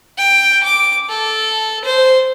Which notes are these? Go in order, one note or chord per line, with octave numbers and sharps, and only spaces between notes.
G5
D6
A4
C5